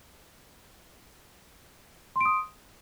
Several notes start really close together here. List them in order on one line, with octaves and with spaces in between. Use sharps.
C6 D7 D#6